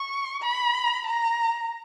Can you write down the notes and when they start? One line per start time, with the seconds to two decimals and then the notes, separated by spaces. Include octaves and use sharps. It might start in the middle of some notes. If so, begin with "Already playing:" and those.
Already playing: C#6
0.42 B5
1.06 A#5